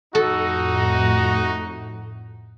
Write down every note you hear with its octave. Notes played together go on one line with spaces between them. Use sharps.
F2 A2 A3 D#4 F#4 A4